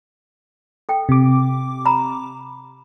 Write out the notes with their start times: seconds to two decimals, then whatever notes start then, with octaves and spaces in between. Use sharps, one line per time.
0.89 A4 G5
1.09 C3 D6
1.86 A#5 B5